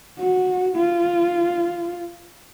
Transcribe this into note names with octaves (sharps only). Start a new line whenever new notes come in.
F#4
F4